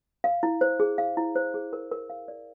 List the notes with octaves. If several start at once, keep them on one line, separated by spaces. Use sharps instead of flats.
F5
E4
C5
G#4
F5
E4
C5
G#4
A#4
A#4
F5
D5